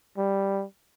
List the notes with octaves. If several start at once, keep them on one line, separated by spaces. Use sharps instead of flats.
G3